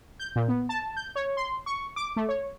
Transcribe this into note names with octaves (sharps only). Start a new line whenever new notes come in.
G6
A#2
B3
A5
G6
C#5
C6
C#6
D6
A3
C#5